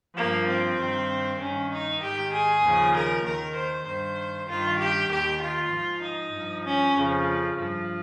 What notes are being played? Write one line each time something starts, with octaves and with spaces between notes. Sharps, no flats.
G2 F3 A#3
C4
G2 D#3
G2 D#3 C#4
D#4
G#2 D#3 G4
G#4
D#2 C#3 F3
A#4
D#2 D#3 A#4
C5
G2 D#3 C5
G2 D#3 F4
G4
D#2 D#3 G4
F4
G#2 F3
D#4
G2 F3
C#4
F2 C#3 F3
G2 F3